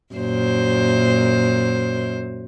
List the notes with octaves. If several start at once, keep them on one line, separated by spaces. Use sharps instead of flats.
F#2 A#2 C5